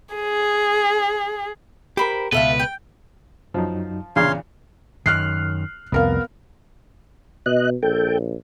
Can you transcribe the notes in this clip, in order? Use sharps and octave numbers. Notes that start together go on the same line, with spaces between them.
G#4
G4 A#4 C5 B5
C#2 G#2 B2 A4 B4 E5 F5
G5
F#2 F3 F#3 D#4
E2 A#2 C#3 C#4 F4 C#5 F5 C6
F#2 D#3 F6 F#6 C7
C2 F2 B3 A#4 F5
B2 D#5 F#6
A#1 A4 G5